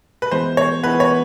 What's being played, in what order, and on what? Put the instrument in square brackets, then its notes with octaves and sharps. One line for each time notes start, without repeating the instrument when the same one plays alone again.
[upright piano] B4
[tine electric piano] E3 G#3 B3 [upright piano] C5
[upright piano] C#5
[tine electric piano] E3 G#3 B3 [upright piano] B4
[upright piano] C#5